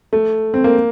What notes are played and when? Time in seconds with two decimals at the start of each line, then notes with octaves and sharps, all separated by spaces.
0.13 A3
0.54 C4
0.64 A#3